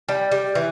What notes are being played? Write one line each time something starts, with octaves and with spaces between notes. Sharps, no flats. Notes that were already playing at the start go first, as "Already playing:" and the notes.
G3
G3
E3